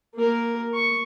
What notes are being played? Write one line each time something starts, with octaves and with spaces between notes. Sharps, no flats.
A#3 A#4
C#6